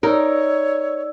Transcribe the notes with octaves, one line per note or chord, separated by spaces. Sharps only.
D#4 A#4 C#5 D5 E6